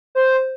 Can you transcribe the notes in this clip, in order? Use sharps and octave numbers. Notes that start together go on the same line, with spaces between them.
C5